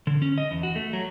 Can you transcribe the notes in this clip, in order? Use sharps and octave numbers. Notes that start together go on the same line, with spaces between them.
D3
C#4
D#5
E2
F#4
A3
F#3